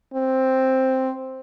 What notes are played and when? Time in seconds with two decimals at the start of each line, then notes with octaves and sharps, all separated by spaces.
0.14 C4